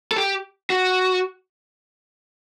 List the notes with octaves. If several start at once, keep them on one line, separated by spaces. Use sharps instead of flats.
A4
G4
F#4